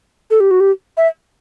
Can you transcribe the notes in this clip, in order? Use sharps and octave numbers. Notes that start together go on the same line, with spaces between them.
A4
G4
F#4
G4
E5